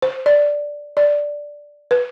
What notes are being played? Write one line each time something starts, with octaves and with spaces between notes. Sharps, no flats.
C5
D5
D5
B4